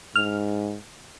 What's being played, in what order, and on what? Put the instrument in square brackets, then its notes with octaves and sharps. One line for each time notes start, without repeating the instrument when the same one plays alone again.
[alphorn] G#2 [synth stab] F6